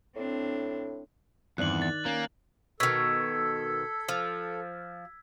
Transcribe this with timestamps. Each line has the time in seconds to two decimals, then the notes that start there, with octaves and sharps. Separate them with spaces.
0.16 A2 C4 D4
1.58 E2 G2 D#3 C4 D5 F#6 F#7
1.82 A6
2.06 A#3 C#4
2.80 B2 D#3 A4 E6 G#6 B6
4.08 F3